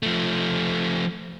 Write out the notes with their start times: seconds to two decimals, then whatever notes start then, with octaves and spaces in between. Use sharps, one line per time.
0.03 F3 A3